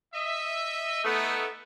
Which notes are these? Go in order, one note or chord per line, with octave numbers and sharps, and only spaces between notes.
D#5 E5
A3 B3 D#4